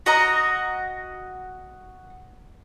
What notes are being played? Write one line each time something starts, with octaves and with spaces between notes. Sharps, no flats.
F#4 D#5 A#5